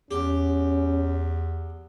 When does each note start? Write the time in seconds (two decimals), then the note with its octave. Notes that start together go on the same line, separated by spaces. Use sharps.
0.11 E2 C#4 G4